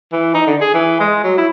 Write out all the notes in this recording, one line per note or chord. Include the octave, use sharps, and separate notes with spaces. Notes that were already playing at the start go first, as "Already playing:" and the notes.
E3
D#4
D3
G#4
E3
G#3
F#3
E4